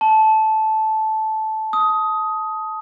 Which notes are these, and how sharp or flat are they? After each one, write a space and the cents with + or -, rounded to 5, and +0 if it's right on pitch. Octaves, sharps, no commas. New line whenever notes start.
A5 -10
D#6 +15